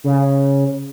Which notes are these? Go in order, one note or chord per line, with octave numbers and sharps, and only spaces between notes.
C#3